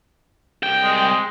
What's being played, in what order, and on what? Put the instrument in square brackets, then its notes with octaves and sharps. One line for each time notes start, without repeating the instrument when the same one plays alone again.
[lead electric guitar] C2 G5
[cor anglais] G#3